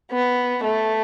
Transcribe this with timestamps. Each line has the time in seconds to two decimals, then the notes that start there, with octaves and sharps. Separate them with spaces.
0.11 B3
0.64 A3